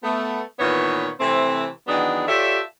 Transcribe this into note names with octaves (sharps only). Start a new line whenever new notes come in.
A3 B3
A#2 D#3 E3 B3 C#5
C3 E3 A3 C4
D#3 E3 F#3 B3 D4 G#4
F4 G4 A4 C#5 D5 E5